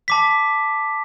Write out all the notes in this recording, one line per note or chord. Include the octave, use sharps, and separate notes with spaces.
A5 D6 B6